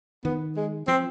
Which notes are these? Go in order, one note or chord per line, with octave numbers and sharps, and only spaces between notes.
D#3 B3
G#3
F3 C4